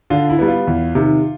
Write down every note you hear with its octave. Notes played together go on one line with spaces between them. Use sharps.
D3 F4
E4
G3 B3
F4
E2
C3 D#3